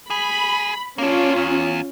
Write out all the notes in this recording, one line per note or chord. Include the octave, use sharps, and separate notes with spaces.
G#4 B5
A#3 C#4 D4 F4
E2